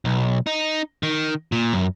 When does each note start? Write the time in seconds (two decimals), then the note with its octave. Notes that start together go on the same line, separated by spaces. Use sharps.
0.05 B1
0.47 D#4
1.03 D#3
1.52 A#2
1.73 F#2